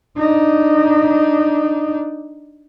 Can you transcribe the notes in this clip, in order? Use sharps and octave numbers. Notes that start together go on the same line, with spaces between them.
D4 D#4